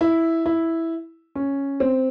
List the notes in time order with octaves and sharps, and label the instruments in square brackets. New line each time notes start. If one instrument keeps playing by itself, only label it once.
[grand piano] E4
E4
C#4
C4